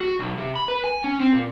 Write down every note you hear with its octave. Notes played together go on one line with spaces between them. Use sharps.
F#4
B1
C3
B5
B4
G#5
C#4
C4
A#2